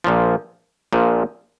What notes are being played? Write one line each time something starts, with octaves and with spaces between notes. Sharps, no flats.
A#1 A#2 F3
A#1 A#2 F3